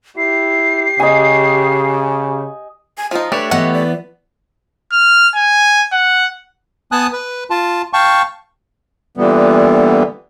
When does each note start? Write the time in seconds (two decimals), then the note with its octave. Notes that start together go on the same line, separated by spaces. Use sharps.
0.17 E4 G4 C7
1.00 C#3 D#5 G#5
2.98 G#5
3.11 F3 D#4 F4
3.32 A3 D4 G4 B4 C#5
3.51 E3 B3 D#5 F#5
3.73 D5
4.93 F6
5.35 G#5
5.93 F#5
6.92 B3 G#5 A5 D#6 F#6
7.13 B4
7.50 F4 A5
7.93 F5 G5 A5 C#6
9.17 A#2 D3 E3 G3 B3